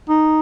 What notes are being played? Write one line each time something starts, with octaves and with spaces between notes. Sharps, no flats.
D#4